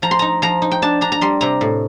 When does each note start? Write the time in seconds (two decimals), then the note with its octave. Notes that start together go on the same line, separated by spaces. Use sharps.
0.02 F3 A#5
0.11 C6
0.19 D#4 A#5
0.42 F3 A#5
0.62 D#4
0.71 G5
0.82 D4 A5
1.01 D4 A#5
1.12 A#5
1.21 G3 C6
1.41 C3 A#5
1.61 A2